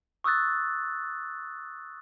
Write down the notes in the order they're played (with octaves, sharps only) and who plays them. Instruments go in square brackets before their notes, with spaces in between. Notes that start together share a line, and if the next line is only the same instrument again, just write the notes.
[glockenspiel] C#6 D#6 E6 F#6 A6